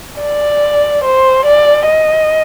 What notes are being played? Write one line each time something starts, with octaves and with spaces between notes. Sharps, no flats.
D5
C5
D5
D#5